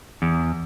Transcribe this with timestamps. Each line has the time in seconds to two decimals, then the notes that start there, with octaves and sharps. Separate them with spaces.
0.22 E2